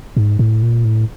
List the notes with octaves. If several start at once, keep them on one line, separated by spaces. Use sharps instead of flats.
G#2
A2
A#2
A2